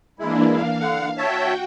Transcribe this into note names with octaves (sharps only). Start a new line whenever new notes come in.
E3 G#3 A#3 D4 E4
F5
D3 F#5
F#4 C#5 E5 G5 A5